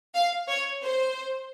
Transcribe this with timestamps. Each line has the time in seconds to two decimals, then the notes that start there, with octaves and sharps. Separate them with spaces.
0.15 F5
0.49 C#5
0.82 C5